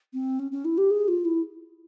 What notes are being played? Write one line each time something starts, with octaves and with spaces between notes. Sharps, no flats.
C4
C#4
C#4
E4
G4
G#4
F4
E4